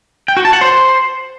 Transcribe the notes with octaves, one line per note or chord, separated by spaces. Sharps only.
G5
F#4
A5
F#5
C5